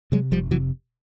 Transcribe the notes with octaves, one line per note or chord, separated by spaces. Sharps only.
C3 F#3 G#3
F1 F3 G3
C3 E3 F#3